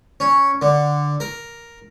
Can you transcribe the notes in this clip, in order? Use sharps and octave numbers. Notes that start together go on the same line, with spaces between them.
C#4
D3
A#4